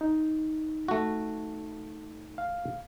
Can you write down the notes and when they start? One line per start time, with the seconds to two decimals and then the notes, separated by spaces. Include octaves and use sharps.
0.01 D#4
0.88 A3 F#4
2.38 F5